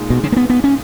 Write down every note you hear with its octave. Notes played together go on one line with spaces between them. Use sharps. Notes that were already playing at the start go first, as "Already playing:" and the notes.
Already playing: A#2 G#3 D#4
B2
C#3
A#3
B3
B3
C#4